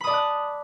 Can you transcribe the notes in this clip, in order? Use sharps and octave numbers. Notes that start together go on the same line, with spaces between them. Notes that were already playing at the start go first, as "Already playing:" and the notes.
D5 A5 B5 D#6 F#6